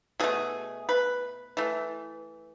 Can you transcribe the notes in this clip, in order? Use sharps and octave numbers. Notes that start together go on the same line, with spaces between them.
B2 A3 G#4
B4
E3 A3